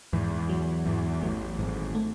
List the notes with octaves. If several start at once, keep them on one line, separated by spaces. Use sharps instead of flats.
E2 G#2 E3
F#3
E2 G#2 E3
A1 A2 F#3
G#1 G#2 A3
A3